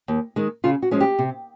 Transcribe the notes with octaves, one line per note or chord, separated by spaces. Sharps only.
D#2
D#3 G#3
C#3 F4
F#4
F3 G#3 C#4
G4
C3